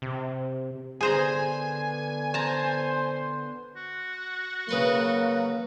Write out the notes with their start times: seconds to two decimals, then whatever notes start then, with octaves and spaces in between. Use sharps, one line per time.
0.02 C3
1.01 D3 B3 G#4 C5 G#5 A#5
2.34 C5 A5 A#5
3.76 F#4
4.69 C#3 F#3 A#3 B4 C6